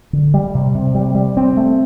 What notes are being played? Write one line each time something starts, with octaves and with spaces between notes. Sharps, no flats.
D3
G3
C3
C3
G3
G3
C4
A3